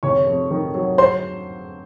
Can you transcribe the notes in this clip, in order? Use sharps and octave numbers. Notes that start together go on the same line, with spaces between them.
F1 C#5 C#6
F2
D#3
F#3
C5 C6